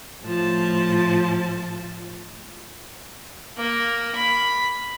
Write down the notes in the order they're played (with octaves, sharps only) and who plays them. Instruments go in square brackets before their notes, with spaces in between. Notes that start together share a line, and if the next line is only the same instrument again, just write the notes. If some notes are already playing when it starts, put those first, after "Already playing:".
[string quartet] A2 F3 A5
[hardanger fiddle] A#3
B5